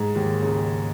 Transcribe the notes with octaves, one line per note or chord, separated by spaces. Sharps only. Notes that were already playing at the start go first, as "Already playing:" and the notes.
Already playing: G#2 G#3
D#2 D#3
C#2 C#3